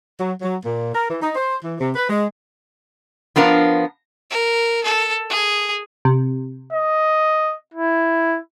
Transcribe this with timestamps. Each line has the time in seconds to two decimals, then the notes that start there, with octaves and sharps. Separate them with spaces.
0.20 F#3
0.41 F#3
0.64 A#2
0.95 A#4
1.10 E3
1.22 D#4
1.35 C5
1.63 E3
1.80 C3
1.95 B4
2.09 G#3
3.36 F3 B3 D4 A#4 F5
4.30 A#4
4.84 A4
5.30 G#4
6.05 C3
6.73 D#5
7.74 E4